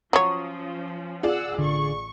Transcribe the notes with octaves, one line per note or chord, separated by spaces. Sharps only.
F3 F#3 C#4 C#5 D#6
F4 G#4 D5 F#5 E6
A1 D3 C#6